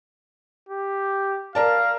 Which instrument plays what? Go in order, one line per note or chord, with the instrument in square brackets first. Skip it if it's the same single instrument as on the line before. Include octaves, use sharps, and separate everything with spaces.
[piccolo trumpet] G4
[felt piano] A#4 D5 A5 [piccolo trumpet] F5